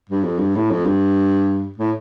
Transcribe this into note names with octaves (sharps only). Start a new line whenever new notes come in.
G2
F2
G2
A2
F2
G2
A2